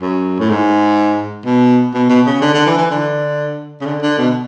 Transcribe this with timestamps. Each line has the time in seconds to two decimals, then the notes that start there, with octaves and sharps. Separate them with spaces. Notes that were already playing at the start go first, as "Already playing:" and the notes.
0.01 F#2
0.40 A2
0.49 G#2
1.45 B2
1.94 B2
2.09 B2
2.26 C#3
2.41 D3
2.54 D3
2.66 E3
2.78 E3
2.91 D3
3.81 C#3
3.86 D3
4.02 D3
4.18 B2